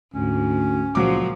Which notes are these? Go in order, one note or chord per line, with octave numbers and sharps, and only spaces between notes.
D2 G#2 C#4
C#2 A#2 F3 F#3 D6